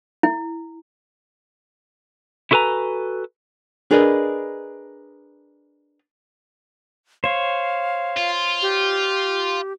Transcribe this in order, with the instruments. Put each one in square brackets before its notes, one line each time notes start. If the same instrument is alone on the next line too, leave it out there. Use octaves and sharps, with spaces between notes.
[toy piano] E4
[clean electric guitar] E4 F#4 A4 B4 G#5 A#5
[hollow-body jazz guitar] D4 G#4 A#4 B4 D5 D#5
[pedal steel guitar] C5 C#5 [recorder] F5
[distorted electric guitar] F4
[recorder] G4